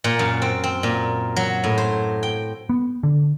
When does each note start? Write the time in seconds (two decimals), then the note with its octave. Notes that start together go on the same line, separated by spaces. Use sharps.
0.04 A#2
0.19 F#2
0.42 C4
0.64 C4
0.83 A#2
1.36 F#3
1.64 A2
1.78 C5
2.23 G5
2.69 B3
3.03 D3